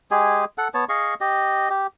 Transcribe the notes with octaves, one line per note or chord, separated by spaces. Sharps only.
G#3 G4 G#4 G#5
A4 F#5
B3 C#5 A5
G#4 D#5 F5 C#6
G4 D#5
G4